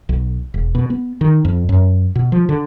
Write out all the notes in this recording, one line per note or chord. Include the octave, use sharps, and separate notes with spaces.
B1
E1
B2
B3
D#3
F2
F#2
B2
F3
D3